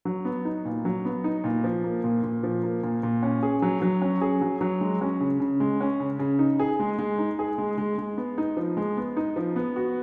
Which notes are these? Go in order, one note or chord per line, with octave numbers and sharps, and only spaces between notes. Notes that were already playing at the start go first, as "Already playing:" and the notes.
F#3
B3
D#4
A#2
F#3
B3
D#4
A#2
F3
A#3
A#2
A#2
F3
A#3
A#2
A#2
C#4
G#4
F#3
F#3
C#4
G#4
F#3
F#3
G#3
C#4
C#3
C#3
G#3
C#4
C#3
C#3
D#4
G#4
G#3
G#3
D#4
G#4
G#3
G#3
G#3
B3
D#4
F3
G#3
B3
D#4
F3
B3
F#4